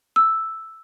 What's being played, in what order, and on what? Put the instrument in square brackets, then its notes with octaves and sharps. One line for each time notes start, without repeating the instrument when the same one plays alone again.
[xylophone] E6